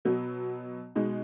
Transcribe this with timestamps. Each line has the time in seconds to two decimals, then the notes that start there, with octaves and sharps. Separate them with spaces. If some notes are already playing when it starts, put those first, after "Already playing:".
0.05 B2 F#3 B3
0.95 B2 G#3 D#4